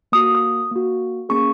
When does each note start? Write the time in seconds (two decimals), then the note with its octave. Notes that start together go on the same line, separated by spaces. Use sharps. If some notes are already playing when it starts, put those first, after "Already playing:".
0.12 A#3 F#4 D#6
0.35 D#6
0.71 A#3 F#4
1.29 A#3 C#4 G#4 C#6